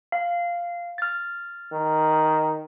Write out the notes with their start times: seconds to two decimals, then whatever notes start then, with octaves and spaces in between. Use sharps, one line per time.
0.12 F5
0.98 F6 A6
1.73 D#3